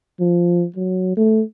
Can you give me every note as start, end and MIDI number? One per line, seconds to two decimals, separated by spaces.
0.20 0.66 53
0.76 1.17 54
1.17 1.42 57